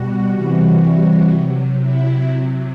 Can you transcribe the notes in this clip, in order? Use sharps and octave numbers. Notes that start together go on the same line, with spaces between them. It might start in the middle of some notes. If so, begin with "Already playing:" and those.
Already playing: B2 G3 F#4
C3 E3 G3 F#4
C3 F#3
E4
C3 F#3